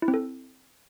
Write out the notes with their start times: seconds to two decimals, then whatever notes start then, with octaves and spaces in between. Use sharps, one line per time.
0.02 E4
0.08 C4
0.14 A4